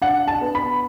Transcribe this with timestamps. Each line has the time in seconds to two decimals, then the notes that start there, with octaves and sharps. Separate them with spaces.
0.02 D4 F#5
0.28 A5
0.41 B3
0.55 B5